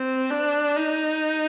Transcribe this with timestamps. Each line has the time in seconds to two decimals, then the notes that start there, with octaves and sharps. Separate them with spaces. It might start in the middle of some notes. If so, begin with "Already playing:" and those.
Already playing: C4
0.30 D4
0.77 D#4